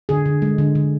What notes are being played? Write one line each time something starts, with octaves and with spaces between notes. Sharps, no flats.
D3 G#4
D3
G#3
D3
D3